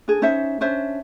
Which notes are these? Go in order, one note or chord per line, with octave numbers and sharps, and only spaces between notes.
D4 G#4
C#4 D#4 C5 E5
C#4 D4 C5 E5